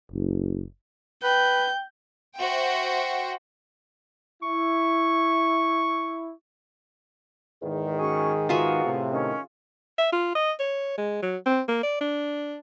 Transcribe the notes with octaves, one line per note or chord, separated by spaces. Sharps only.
F#1
B4 G5 G6
F#4 C5 E5 G5
E4 C#6
E2 G#2 D#3
C#4 F#4 G#4 C#6
B3 F4 F#4 G#4 E5 A#5
A2 C3
D#3 C#4
E5
F4
D#5
C#5
G#3
F#3
C4
A#3
D5
D4